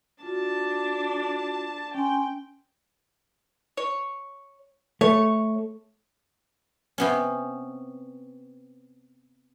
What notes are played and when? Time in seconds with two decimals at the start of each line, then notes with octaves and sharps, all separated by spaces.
0.23 D4 F4 F#4 A5
1.95 C#4 G5 G#5 C6
3.77 C#5
5.01 A3 C#5
6.98 C3 B3 C#4